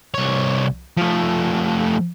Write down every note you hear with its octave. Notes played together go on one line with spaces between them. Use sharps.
C2 C#5
F3 A3